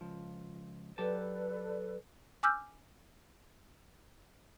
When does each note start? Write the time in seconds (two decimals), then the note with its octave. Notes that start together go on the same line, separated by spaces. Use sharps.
0.01 C#2 F3
0.98 F#3 G4 A4 B4 D5 A5
2.43 G#5 D6 E6 F6 G6